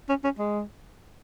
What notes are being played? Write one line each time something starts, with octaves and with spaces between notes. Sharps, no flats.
C#4
C#4
G#3